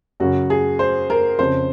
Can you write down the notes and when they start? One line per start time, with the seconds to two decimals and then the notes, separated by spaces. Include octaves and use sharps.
0.20 F#2 C#3 F#4
0.50 G#4
0.79 C5
1.10 A#4
1.39 F2 C#3 C5